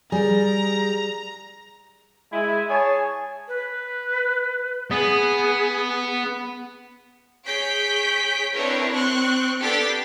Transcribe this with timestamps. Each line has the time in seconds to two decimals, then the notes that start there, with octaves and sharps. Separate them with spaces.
0.12 G3 G#4 A#4 A#5
2.33 G#3 E4 G#5
2.70 G#4 C#5 G#5 A5
3.48 B4
4.91 B3 G#4
7.45 G#4 C#5 G6 B6 D7
8.51 C4 D4 E4 A#4 B4 C#5
8.93 C4 C6 C#6 F#6
9.60 B3 D4 G4 A4 A6 B6